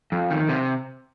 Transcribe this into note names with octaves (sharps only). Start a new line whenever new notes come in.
F2
D#3
C3